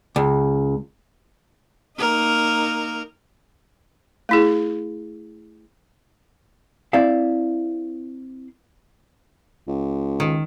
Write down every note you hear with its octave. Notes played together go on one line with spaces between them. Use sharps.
C#2
A#3 D#4 A#4
A3 E4 G#4
C4 E4 D5 E5 F5
C#2
D#3